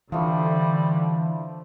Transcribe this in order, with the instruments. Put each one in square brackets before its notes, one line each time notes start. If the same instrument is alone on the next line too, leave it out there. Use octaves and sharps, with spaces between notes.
[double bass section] D3 [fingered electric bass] E3 [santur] F3 A3 [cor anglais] G3